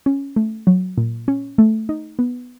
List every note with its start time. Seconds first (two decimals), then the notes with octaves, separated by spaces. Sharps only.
0.06 C#4
0.36 A3
0.67 F#3
0.98 A#2
1.28 C#4
1.58 A3
1.89 D#4
2.19 B3